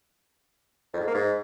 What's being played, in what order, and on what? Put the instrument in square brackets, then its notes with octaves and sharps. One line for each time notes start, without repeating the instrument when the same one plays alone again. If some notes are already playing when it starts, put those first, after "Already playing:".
[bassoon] F2
G#2
A#3
G#2